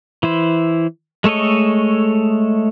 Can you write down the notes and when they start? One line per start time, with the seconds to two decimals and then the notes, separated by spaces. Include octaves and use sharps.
0.23 E3 E4 C5
1.24 G#3 A3 A4 C#5 D#5